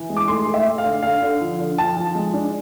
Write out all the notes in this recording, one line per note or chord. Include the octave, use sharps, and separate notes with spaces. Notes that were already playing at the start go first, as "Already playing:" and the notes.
Already playing: E3
G#3
D6
A3 C6
A3
E5
A3
F5
D3
D3 F5
D3
F3
D3
F3 A5
F3
G#3
D4